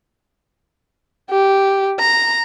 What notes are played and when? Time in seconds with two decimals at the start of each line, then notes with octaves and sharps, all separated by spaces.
1.30 G4
1.99 A#5